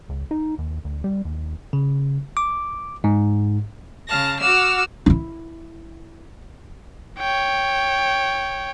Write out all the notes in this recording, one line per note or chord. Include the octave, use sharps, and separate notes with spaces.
C#2
D#4
D#2
D2
G3
D#2
C#3
D6
G#2
C#3 F5 A5 A#6
F#4 F#5 D6 E6 F6
D#4 E4
C#5 G5